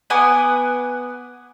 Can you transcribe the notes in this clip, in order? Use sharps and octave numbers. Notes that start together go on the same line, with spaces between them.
B3 F#5 G#5 D6